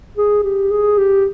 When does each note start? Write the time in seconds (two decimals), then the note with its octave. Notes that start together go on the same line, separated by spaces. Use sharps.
0.17 G#4
0.43 G4
0.71 G#4
0.98 G4